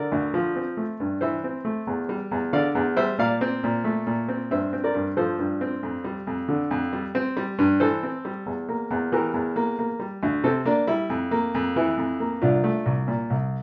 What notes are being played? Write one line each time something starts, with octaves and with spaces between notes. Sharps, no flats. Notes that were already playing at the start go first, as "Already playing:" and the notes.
Already playing: D3 A#4 D5
D2
F3
C4
A3
G2
E3 C5 E5
C4
A3
E2
G3
E2
D3 D5 F5
E2
G3 C5 E5
A#2 D5 F5
C4
A#2
A3
A#2
C4
G2 C5 E5
C4
A#4 D5
G2
F3 A4 C5
G2
C4
F2
G3
F2
D3
F2
G3
C4
G3
G2
E3 A4 C5
C4
G3
E2
A#3
E2
E3 G4 A#4
E2
A#3
A#3
G3
D2
C3 A4 C5
A#3 D4
G3 E4
F2
A#3
F2
E3 E4
F2
A#3
C2 D4 F4
A3
C2
A#2
C2